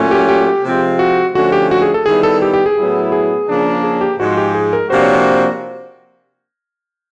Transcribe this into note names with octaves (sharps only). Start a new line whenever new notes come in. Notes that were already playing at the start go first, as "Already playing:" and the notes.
Already playing: A#2 F#3 A3 C#4
G4
G4
C3 F3 G#3 C4 F4
F#4
D3 F3 A3 C#4 F#4
G4
F#4
G#4
A4
D#3 G3 B3 E4 G#4
A4
G4
G4
G#4
A2 F#3 B3 E4
G#4
C#3 F3 A#3 D4
G#4
G4
G#2 F3 G#3 F#4
G4
G#4
A#4
C3 F3 A#3 D4 F#4 C5
C#5
C5